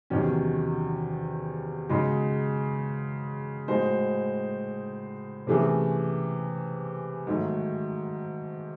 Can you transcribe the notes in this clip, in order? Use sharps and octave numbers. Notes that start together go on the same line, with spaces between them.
E2 C3 D#3 F#3 C#4
C#3 G#3 D#4 F#4
A2 G#3 D#4 F#4 C5
C3 E3 A3 C#4 G#4
G#2 D#3 F#3 A3